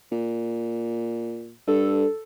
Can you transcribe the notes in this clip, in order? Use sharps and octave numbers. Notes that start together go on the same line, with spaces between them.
A#2
G2 A4